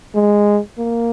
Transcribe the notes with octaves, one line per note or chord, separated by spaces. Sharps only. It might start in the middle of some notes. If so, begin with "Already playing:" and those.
G#3
A#3